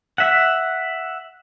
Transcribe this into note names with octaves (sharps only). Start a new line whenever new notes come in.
E5 F#5